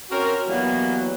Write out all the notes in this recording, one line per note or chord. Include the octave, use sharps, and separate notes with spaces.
C4 C#4 F#4 A#4
E3 F#3 G3 A#3 B3